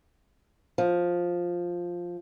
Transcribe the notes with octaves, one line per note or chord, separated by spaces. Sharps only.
F3